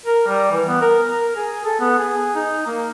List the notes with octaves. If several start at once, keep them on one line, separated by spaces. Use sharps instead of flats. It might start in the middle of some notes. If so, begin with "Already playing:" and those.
A#4
G3
E3
B3
A#4
A#4
G#4
A4
B3
G#4
D#4
A#3